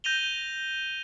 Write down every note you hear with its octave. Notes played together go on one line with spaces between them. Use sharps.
G6 A#6 D#7 F7 G7